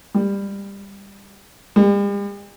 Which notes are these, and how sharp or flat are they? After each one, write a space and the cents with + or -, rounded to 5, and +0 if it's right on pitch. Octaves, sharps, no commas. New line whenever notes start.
G3 +20
G3 +45